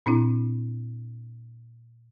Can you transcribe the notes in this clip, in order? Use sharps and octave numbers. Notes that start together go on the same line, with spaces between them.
A#2 C4 D4 E4